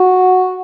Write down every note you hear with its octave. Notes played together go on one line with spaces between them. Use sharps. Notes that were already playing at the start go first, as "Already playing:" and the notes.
Already playing: F#4